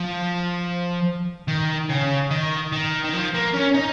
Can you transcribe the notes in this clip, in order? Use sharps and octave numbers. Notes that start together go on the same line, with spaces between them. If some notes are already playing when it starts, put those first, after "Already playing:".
Already playing: F3
D#3
C#3
D#3
D#3
D#3
F3
A#3
C#4
D#4